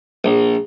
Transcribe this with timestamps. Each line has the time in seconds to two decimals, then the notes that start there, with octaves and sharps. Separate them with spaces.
0.24 A#1